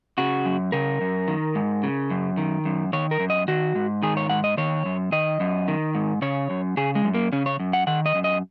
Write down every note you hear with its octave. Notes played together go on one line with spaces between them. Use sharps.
C#3 F#4
F#2
C#3 A#4
F#2
D#3
G#2
C#3
F#2
D#3
F#2
D#3 C#5
A#4
F#2
D#5
D#3 F#4
G#2
D#3 G#4
C#5
G#2 F#5
D#5
D#3 C#5
F#2
D#3 D#5
F#2
D#3
G#2
C#3 C#5
F#2
C#3 G#4
G#3
F#2
A#3
C#3 C#4
C#5
F#2
F#5
D#3 F#5
D#5
F#2
D#5